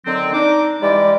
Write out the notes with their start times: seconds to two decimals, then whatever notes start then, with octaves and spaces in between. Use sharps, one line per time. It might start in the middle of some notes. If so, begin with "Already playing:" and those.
0.06 D3 D#3 F#3 C4
0.33 D4 D#4 D6
0.82 E3 G3 G#3 D5